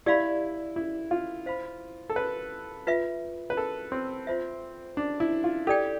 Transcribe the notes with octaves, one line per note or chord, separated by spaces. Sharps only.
E4 G4 D5 F5 B5
E4
F4
C5 F5 B5
A4
B4
F4 B4 E5
B4
A4
C4
F4 C5 E5
D4
E4
F4
G4 A4 D5 G5